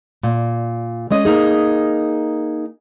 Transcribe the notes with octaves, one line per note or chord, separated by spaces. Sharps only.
A#2
G#3 C#4 D#5
A#3 D#4 G#4